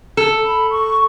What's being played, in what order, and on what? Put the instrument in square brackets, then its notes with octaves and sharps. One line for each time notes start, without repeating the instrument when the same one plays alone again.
[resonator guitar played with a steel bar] A4
[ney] B5
C#6